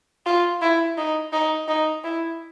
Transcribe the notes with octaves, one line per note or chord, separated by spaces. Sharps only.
F4
E4
D#4
D#4
D#4
E4